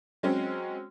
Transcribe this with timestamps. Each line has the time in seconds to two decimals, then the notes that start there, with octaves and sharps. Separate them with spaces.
0.23 F#3 G#3 C4 C#4